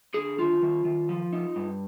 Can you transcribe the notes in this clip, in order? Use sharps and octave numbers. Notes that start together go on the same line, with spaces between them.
D3 G#4
D#3 F4
D#3
D#3
F3
D#4
G2